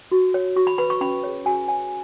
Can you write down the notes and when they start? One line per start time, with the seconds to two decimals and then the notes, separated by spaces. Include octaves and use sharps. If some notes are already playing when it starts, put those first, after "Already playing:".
0.12 F#4
0.34 C#5
0.56 F#4 C#6
0.67 B5
0.78 B4 B5
0.90 C#6
1.01 C#4 B5
1.24 G#4 C#5
1.45 F#4 G#5
1.68 C#5 G#5